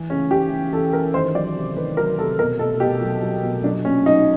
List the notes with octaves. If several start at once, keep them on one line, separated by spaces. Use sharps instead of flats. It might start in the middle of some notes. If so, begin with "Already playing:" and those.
Already playing: E3
C#3 C#4
E3 G4
E3
E3 A4
E3 A#4
D#3 C5
F#3 D5
C3
D#3 B4
F#3 A#4
C3 A4
B2 A#4
B2 A4
B2 G4
F#3
F#3
B2
F#3 D4
A#2 C#4
F#3 D#4